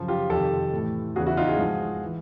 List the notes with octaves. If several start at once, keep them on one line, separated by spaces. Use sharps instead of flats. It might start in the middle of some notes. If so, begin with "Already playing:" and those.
Already playing: F#2 C#3 F3
F4 G4
F2 C3 D#3 G4 A4
A2 E3
E2 C#3 E3 F#4 G#4
E4 F#4
D#4 F4
F#4 G#4
G#2 F3
E3